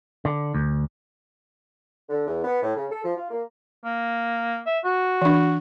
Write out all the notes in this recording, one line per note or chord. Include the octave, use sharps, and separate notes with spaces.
D3
D2
D3
E2
B3
A2
C#3
A4
F3
F4
A#3
A#3
E5
F#4
E3 D4